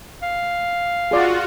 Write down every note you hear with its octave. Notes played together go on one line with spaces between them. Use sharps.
F5
F4 F#4 G#4 D5